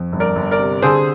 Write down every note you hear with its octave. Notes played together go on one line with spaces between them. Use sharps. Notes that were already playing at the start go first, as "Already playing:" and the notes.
Already playing: F2
G1
A#4 D5
G1
A#4 D5
C3
D3 G#4 C5